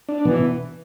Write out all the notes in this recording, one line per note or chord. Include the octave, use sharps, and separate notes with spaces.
D4
B2 E3